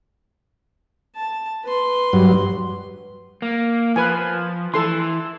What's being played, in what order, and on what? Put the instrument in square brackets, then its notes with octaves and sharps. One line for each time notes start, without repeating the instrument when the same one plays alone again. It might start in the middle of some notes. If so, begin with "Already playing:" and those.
[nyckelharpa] A5
B4 C6
[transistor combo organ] G2 F#3
[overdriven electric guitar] A#3
[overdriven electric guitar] F3 [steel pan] B4 G#5
[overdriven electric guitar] E3 [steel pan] A4 C6